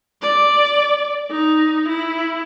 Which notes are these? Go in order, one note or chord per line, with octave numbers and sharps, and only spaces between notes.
D5
D#4
E4